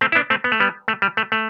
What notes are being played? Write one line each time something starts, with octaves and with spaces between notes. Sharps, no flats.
A3 C4
E4
B3 D4
A3 C4
B3
A3
G3 B3
A3
G3
A3
A3